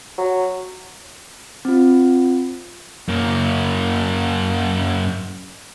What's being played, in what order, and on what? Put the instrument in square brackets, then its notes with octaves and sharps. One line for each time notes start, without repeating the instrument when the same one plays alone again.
[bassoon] F#3
[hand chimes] C4 F4
[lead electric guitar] F#2 A#3